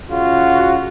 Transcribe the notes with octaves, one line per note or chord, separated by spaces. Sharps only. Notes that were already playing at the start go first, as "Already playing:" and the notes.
C#3 F4 F#4